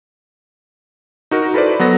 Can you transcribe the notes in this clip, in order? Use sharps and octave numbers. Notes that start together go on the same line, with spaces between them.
D#4 F#4 A#4
E4 A4 B4 C5 D5
F#3 B3 A4 A#6